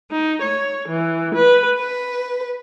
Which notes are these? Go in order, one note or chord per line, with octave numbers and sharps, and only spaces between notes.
D#4
C#5
E3
B4
B4